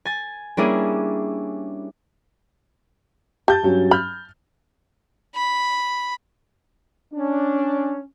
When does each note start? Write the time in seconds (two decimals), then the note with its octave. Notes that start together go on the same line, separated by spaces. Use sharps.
0.05 G#5 A6
0.57 G3 A#3 C#4 D4 E4 G#4
3.48 G4 A5 G6 A6
3.63 G2 F#3 C#4
3.91 B5 F6 G6
5.35 B5
7.14 C#4 D4